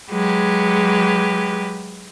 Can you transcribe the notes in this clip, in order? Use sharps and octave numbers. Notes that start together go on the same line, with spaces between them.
F#3 G#3 G4 B4